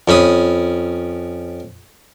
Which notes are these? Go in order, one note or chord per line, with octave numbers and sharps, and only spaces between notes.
F2 C#4 B5 D#6